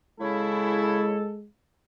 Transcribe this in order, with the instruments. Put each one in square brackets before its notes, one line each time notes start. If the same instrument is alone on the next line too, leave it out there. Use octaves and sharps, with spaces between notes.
[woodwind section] C#3 E4 [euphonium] G#3 [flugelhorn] A4